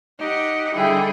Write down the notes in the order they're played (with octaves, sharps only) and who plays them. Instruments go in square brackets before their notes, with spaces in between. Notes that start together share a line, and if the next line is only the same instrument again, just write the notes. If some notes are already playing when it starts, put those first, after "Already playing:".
[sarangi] D#4 [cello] G4 F#5
[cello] D3 G3 [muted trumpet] E4 [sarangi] G#4 [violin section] G5